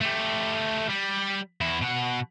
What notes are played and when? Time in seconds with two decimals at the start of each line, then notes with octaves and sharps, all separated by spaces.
0.01 A3 G4
0.90 G3
1.61 E2 E4
1.82 B2 F#5